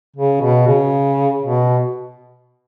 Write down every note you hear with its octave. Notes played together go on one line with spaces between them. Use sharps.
C#3
B2
C#3
B2